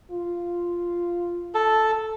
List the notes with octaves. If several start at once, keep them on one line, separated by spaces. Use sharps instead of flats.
F4
A4